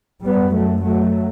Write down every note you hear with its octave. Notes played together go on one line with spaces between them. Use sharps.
F#2 G3 B3
F#3 A3
F#3 A3